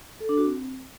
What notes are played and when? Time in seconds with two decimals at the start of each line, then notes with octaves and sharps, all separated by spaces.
0.20 A4
0.29 D4
0.38 F#4
0.46 C4